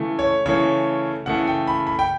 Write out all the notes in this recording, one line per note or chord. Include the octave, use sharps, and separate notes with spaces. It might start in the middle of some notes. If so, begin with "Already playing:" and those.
Already playing: C#3 E3 A3
C#5
C#3 E3 A3 C#5
C#3 E3 A3 F#5
G5
B5
B5
G5